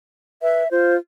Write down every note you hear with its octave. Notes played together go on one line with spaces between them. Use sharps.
B4 E5
F4 C5